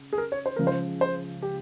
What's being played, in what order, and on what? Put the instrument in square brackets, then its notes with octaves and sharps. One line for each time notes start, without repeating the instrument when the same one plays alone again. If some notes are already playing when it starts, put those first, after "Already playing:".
Already playing: [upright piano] C#3
[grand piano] G#4
A#4
C#5
C5
[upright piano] C#2 C#3 F3 [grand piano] A#4
[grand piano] C5
C5
G4